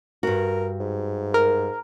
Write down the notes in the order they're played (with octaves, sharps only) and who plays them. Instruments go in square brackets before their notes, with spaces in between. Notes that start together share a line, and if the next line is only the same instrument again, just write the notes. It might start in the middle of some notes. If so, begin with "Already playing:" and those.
[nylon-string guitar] G2 F#4 [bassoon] A#4
[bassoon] G#2
[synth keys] A#4